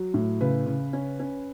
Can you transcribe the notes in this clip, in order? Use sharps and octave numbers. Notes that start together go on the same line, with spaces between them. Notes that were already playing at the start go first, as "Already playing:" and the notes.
Already playing: F#3
A2
C#3 B4
C#3
C#4
C#4